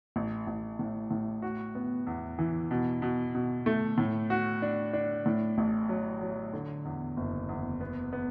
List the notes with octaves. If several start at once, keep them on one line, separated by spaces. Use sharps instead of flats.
A1
A1
A2
A2
F#4
B3
E2
E3
B2
B2
B2
A3
A2
F#4
D4
D4
A2
A1
F#3
F#3
D3
E2
F#1
E2
B3
B3